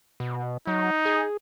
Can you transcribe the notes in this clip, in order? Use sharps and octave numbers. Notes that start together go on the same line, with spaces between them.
B2
F#3 D#4
G#4